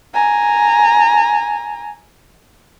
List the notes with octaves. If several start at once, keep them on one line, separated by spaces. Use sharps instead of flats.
G#5 A#5